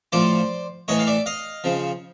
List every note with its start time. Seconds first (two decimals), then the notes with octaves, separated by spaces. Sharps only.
0.12 A2 F3 C5 D5
0.88 A2 E3 C#5 D#5
0.99 F5
1.07 D5 E5
1.26 D#5 F5
1.64 C#3 F3